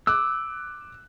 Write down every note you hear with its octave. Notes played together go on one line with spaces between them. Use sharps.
D6 E6 F#6